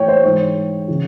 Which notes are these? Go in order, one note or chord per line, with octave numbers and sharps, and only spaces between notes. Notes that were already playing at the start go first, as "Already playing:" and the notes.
Already playing: A2 E3 C#5 G5
C5
G#2 E3 C#5
C#3 E3